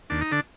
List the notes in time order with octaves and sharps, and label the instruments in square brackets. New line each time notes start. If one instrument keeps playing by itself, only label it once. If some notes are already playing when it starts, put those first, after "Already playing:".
[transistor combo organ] D#2 D4
D#4
D3 D4